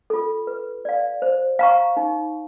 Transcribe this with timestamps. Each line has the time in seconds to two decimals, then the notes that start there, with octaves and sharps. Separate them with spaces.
0.10 F4 A4
0.47 B4
0.85 D5 F5
1.22 C5
1.59 F5 A#5 C#6
1.97 D#4